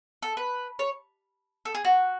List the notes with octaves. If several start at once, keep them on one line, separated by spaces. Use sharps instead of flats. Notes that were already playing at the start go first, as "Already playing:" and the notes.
A4
B4
C#5
A4
G#4
F#4